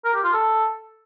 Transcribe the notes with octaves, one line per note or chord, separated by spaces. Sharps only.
A#4
G4
F4
A4